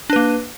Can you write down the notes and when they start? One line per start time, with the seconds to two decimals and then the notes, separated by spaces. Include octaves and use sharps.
0.10 D4
0.13 B4
0.16 A#3